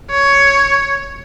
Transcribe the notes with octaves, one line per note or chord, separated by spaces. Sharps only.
C#5